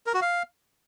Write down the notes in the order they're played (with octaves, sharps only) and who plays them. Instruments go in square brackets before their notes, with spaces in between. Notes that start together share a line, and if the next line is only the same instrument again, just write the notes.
[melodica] A#4
F#4
F5